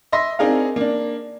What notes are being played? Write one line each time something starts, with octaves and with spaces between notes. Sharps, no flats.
D#5 E5 C6 A#6
C4 D4 D#4 G#4 A#4 F5
A#3 D4